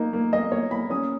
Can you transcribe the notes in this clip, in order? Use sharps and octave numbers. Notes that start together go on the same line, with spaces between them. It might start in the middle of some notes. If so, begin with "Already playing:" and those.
Already playing: A#3 D#4
A#3
A#3 D#5
A#3 C#5
A#3 B5
C#4 D#6